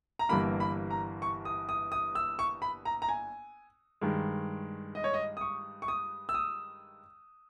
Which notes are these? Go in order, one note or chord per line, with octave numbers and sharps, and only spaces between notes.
A#5
G1 G2 E3 G3 A#3 B5
B5
A#5
C#6
D#6
D#6
D#6
E6
C#6
B5
A#5
A#5
G#5
G2 D#3 G#3
D#5
C#5
D#5
D#6
C#6
C#6
D#6
E6
D#6